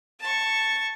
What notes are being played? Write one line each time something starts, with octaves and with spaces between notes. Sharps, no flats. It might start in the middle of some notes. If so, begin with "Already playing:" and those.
A5 C#6